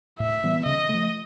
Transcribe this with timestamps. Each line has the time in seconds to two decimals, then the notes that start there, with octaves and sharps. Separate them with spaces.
0.19 A2 E5
0.44 E3 G3 B3
0.66 C#3 D#5
0.89 F3 A3